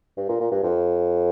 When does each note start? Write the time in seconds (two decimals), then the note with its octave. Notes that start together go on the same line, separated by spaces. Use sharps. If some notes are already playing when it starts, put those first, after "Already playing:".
0.17 G2
0.29 A#2
0.41 A#2
0.51 G2
0.64 F2